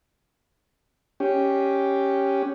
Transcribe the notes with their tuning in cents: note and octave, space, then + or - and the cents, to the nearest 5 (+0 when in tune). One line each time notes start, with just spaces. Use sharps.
C#4 +0 G4 +0